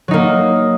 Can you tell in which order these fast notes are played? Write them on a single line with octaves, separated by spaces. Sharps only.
F#3 D#4 A#3